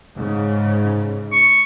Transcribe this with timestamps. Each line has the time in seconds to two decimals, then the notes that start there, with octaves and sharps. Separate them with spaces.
0.16 G#2 C#3
1.32 C#6